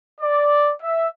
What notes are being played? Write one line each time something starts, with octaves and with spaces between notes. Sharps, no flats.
D5
E5